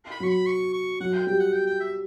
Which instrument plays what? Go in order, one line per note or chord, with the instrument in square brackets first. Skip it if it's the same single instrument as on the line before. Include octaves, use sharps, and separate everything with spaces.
[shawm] B5
[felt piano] F#3 [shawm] C#6
[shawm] B5
C#6
C#6
[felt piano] F#3 [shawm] F#5
[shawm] G5
[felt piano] G3 [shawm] G5
[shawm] F#5
G5
G5
E5